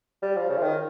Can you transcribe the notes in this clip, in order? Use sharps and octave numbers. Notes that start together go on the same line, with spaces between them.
G3
F3
C#3
F3
D#3